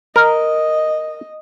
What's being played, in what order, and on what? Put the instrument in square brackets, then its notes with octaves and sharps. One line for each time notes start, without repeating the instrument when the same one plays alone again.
[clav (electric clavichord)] A#4 [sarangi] D#5